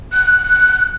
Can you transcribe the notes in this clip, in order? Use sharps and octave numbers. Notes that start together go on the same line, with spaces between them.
F#6